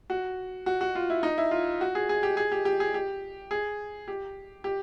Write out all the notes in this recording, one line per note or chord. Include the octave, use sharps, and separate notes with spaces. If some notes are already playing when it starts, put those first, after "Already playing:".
F#4
F#4
F#4
F4
E4
D#4
E4
F4
F#4
G#4
G#4
G4
G#4
G4
G4
G#4
G4
G#4
G4
G4